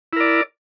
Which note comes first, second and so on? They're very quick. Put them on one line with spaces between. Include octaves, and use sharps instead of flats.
E4 A#4 D5